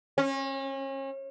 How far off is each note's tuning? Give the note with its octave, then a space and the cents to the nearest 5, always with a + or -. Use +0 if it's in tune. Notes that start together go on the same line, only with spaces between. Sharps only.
C#4 -35